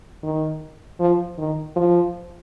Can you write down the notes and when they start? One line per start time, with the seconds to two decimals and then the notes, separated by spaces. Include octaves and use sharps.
0.23 D#3
1.00 F3
1.38 D#3
1.76 F3